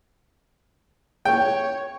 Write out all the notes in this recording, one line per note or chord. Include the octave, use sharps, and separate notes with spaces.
C#5 G5